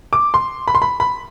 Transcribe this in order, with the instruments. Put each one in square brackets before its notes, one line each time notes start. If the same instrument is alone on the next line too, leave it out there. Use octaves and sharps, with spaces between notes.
[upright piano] D6
C6
B5
C6
B5
B5